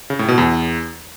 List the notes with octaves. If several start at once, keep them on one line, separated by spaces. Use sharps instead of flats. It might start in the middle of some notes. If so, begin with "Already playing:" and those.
C#3
A2
B2
E2